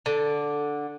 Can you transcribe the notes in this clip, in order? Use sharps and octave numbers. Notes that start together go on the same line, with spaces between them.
D3 A4